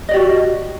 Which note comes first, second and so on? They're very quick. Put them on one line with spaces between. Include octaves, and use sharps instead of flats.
D#5 D5 G4 F#4